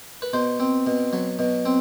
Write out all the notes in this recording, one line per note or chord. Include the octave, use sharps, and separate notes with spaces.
B4
B2 C5
C4
B2
F#3
B2
C4